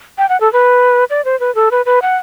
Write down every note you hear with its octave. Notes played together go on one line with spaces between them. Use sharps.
G5
F#5
A4
B4
D5
C5
B4
A4
B4
B4
F#5